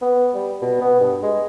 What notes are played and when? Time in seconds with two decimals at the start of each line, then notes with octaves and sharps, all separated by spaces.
0.02 B3
0.35 G3
0.62 B2
0.81 B3
1.01 G2
1.23 G#3